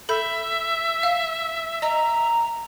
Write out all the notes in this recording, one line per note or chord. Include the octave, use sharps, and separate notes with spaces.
A4 E5 B5 G6
F5
D#5 A#5